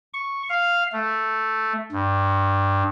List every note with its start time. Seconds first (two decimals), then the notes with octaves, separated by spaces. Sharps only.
0.14 C#6
0.49 F5
0.92 A3
1.92 G2